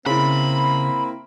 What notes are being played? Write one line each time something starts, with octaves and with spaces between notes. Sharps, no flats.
C#3 A#3 C4 E4 B5 B6